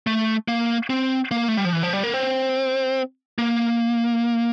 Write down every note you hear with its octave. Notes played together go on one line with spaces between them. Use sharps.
A3
A#3
C4
A#3
A3
G3
F3
E3
F3
G3
A#3
C4
A#3